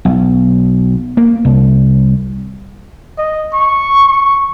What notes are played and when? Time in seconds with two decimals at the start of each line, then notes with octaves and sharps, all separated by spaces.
0.05 B1
1.17 A#3
1.45 C2
3.18 D#5
3.53 C#6
4.07 C#6